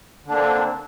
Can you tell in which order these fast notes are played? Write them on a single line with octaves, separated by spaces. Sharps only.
D3 D4 A#3 C4